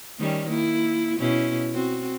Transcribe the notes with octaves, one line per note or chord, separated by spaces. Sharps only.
D#3 G3 C#4
A#3 E4
B2 C#4 E4
C4 F#4